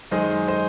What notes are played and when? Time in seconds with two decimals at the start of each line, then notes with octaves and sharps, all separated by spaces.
0.11 F#2 D#3 G#3 C5 D#5
0.48 C5 D#5